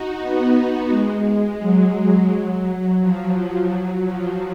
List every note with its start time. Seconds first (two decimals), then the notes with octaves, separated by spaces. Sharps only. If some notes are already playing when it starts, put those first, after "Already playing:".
Already playing: D#4 F#4
0.19 B3
0.89 G#3
1.24 G#3
1.59 F#3
3.00 F3
3.35 F3
3.70 F#3
4.05 F3